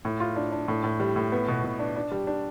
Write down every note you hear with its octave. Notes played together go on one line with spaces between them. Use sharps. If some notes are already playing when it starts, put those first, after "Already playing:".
A2
F4
D4
D4
A2
A2
G3
A2
B3
B2
B2
D4
D4
G3
D4